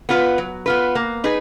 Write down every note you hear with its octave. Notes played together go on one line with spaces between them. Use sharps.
B3 F4 B4
F#3
B3 F4 B4
A#3
D#4 G#4 B4